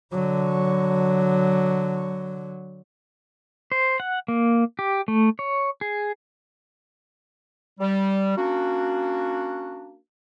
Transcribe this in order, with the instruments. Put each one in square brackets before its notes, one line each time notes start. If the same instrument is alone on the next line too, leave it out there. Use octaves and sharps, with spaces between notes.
[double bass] D3 F#3
[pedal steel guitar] C5
F#5
A#3
G4
A3
C#5
G#4
[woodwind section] G3
A#3 C#4 D4 F#4